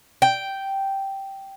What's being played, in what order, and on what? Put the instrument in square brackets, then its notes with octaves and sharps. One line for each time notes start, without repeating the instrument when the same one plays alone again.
[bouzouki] G5